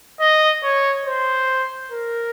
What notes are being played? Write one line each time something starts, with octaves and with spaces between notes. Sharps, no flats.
D#5
C#5
C5
A#4